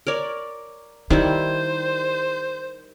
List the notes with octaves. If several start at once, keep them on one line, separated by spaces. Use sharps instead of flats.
A#4 C#5 D5
D#3 G3 D#4 E4 C5